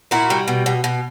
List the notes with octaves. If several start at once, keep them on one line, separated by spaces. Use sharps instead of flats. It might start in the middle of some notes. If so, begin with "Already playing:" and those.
A#2 E4 F#4
G3
B2
B2
B2